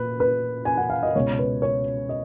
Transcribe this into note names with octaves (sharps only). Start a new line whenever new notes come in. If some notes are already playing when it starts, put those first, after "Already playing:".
Already playing: A#2 B4
B4
G#5
F#5
F5
D#5
C#2 B2 C#5
B4
C#5
D#5